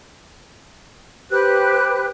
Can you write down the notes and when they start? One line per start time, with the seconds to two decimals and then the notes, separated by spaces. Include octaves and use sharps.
1.30 G4 B4 C5 F#6